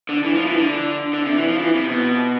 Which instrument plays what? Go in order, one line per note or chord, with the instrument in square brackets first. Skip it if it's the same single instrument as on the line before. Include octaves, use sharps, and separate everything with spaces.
[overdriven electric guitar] D3
E3
F3
E3
D3
D3
C3
E3
F3
E3
C3
B2